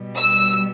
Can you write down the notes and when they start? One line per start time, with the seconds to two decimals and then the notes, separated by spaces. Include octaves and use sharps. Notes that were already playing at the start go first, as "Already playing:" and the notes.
Already playing: B2 G3
0.17 E6